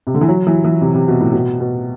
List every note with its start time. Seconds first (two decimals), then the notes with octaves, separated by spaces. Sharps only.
0.07 C3
0.14 D3
0.21 E3
0.28 F#3
0.47 E3
0.64 E3
0.81 C3
0.95 C3
1.08 B2
1.21 A2
1.33 B2
1.60 B2